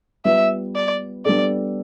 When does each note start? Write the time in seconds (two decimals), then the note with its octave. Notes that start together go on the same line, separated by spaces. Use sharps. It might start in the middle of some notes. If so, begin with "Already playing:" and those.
0.25 G3 B3 F4 B4 E5
0.75 D5
1.26 G3 B3 D4 A4 D5